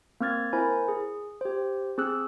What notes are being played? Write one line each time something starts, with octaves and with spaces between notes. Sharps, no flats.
A#3 C4 F6 G#6 A6
E4 A#4 C5 G#5 B5
G#4
G4 C5
C4 G#4 E6 F#6